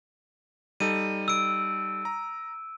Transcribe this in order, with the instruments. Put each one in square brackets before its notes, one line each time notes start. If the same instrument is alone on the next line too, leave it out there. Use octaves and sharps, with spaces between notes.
[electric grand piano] G3 D#4 A4 [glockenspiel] D#7
[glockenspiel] E6 D7
[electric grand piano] A#5